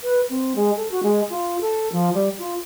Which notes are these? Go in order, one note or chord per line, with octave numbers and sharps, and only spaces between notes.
B4
C4
G#3
A4
F#4
G#3
F4
A4
F3
G3
F4